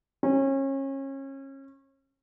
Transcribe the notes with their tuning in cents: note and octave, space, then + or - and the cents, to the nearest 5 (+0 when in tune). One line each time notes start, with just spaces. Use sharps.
C#4 -30